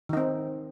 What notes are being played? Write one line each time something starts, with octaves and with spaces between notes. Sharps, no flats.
D#3 C4 D#4